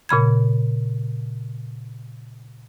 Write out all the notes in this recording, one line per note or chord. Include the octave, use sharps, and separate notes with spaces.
A#2 C#3 B5 G#6